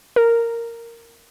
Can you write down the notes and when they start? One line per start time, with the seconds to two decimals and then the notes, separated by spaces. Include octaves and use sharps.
0.16 A#4